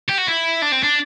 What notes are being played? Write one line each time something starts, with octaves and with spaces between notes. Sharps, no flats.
G4
F#4
E4
D4
C4
D4